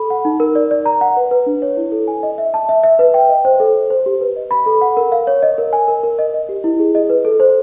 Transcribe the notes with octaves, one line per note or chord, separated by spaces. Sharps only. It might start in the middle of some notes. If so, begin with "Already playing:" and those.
Already playing: A4 B5
F#5
D#4
A#4
D5
D5
A#5
F#5
B4
B4
D4
C#5
E4
A4
G#5
D#5
E5
A5
E5
E5
B4
G5
D#5
C5
A4
C5
C5
G4
B4
D#5
B5
A4
F#5
A#4
F5
C#5
D#5
A#4
G#5
A#4
A#4
D#5
D#5
G4
E4
G#4
D#5
B4
A4
C5